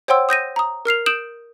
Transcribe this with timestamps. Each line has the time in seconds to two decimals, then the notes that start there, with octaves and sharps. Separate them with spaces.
0.08 C5 C#5 F#5 G5 C6 E6
0.29 D#6 G6 A#6 D#7
0.56 A#5 D#6
0.85 A#4 F6 C7 F7
1.06 D#6 G6 D7 E7 F#7